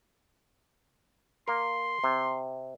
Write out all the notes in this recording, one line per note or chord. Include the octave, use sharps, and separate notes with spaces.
A#3 A#4 C6
C3